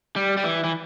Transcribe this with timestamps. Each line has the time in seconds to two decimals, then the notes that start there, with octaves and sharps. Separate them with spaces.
0.16 G3
0.37 G3
0.44 E3
0.64 E3